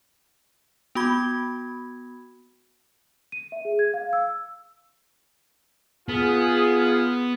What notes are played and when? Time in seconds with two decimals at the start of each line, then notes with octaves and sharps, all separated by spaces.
0.95 B3 F#4 B5 G#6
3.32 D#7
3.52 E5
3.65 G#4
3.79 G#6
3.94 F5
4.13 E6
6.09 B3 F4 G#4